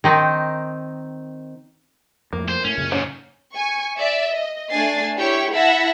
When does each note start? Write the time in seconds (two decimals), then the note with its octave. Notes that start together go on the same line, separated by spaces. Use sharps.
0.04 D#3 C4 D#4
2.33 F2 A2 A#3
2.49 C5
2.65 A2 C#4
2.78 F#2 A#2 C#3
2.92 G#2 C#4
3.53 G#5 C#6
3.98 D5 E5
4.33 D#5
4.70 A3 D4 G#5 A6 C7
5.16 E4 G4 C#5 G5 C#6
5.52 E4 E5 F#5 A5 B5 A#6